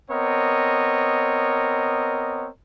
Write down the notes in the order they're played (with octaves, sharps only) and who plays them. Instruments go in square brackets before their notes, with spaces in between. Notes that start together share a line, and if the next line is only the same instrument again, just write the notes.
[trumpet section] B3 C4 A#4 C#5 D#5